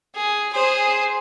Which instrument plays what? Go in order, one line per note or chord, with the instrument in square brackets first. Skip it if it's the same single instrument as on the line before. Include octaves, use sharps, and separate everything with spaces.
[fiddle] G#4
G#4 C5